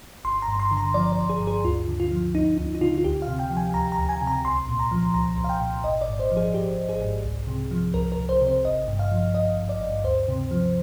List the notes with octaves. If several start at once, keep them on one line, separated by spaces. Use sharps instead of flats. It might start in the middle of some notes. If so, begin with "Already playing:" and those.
G1 C6
A#5
G2
C6
D3
A#5
F3 D5
D5
G1
G#4
G2
G#4
D2 F4
D3
F4
F3
D2 D#4
D2 D#4
D#4
D3 F4
F4
D2 G4
F5
C3
G5
F3
G#5
D2 A#5
A#5
D2
G#5
C3
A#5
C2 C6
A#2
A#5
F3
C2 A#5
C2
F5
G5
A#2
G#1 D#5
D5
G#2
C5
F3
G#4
G#1 G4
G#1
G#4
G#2
C2
C3
F3
C2 A#4
A#4
C2
C5
C3
C5
G#1 D#5
G2
F5
F3
G#1 D#5
G#1
D5
G2
D2 C5
C3
F3